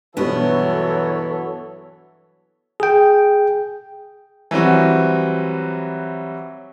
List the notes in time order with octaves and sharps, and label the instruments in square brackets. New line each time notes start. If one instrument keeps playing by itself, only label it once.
[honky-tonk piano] G2 B2 [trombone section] E3 F#3 [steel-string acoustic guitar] B3 [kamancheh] A4 C#5
[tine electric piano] G#4 G5
[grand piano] E3 F#3 G3 C4 F#4